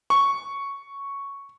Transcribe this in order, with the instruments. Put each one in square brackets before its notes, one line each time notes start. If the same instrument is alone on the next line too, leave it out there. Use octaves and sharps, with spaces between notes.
[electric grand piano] C#6